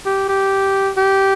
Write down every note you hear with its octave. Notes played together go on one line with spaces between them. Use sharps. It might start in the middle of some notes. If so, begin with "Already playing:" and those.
G4
G4
G4